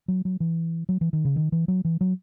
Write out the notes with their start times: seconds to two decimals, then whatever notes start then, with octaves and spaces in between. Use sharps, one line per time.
0.08 F#3
0.25 F#3
0.40 E3
0.89 F#3
1.01 E3
1.13 D#3
1.25 C#3
1.36 D#3
1.52 E3
1.68 F#3
1.85 E3
2.01 F#3